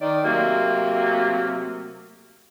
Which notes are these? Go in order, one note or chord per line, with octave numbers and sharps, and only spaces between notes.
D#3 D5
C3 F#3 A3 A#3